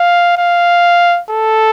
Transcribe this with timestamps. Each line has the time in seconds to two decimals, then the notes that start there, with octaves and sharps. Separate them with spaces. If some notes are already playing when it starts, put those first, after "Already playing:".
Already playing: F5
0.38 F5
1.30 A4